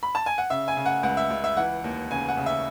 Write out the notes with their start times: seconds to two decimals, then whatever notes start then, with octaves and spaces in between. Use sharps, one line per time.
0.03 B5
0.15 A5
0.26 G#5
0.38 F#5
0.50 C#3 E5
0.68 G#5
0.77 C#3
0.86 F#5
1.03 C#2 F#5
1.17 E5
1.31 C#2
1.44 E5
1.57 E3 F#5
1.84 D#2
2.11 C#3 G#5
2.29 F#5
2.37 C#3
2.46 E5